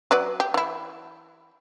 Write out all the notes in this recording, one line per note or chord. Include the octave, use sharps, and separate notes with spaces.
F#3 B4 D5
G4
E3 E4